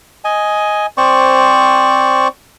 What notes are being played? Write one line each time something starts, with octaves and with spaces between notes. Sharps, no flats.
D#5 G#5
C4 C5 D5 C#6